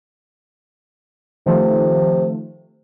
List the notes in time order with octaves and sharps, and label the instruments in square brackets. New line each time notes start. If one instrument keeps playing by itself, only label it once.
[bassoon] C3 [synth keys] D#3 F3 A3